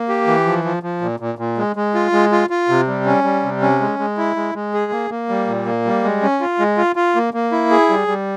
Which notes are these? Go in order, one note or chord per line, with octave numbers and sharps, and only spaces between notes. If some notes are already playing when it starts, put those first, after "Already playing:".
Already playing: A#3
G4
E3
F3
F3
F3
A#2
A#2
A#2
G#3
G#3
F4
G#3
F4
F4
C3
G3
C#4
G3
C3
C#4
G#3
G#3
E4
G#3
G#3
G#4
A#3
A#3
G3
A#2
A#3
G3
G#3
C#4
F4
G#3
F4
F4
A#3
A#3
E4
G#4
G3
G3